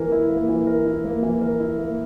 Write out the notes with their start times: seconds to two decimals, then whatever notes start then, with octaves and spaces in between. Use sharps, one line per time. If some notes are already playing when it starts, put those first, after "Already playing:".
Already playing: E3 A#3 E4 A#4
0.12 E4
0.30 A#3
0.49 E3
0.67 A#4
0.85 E4
1.04 A#3
1.23 E3
1.41 A#4
1.60 E4
1.78 A#3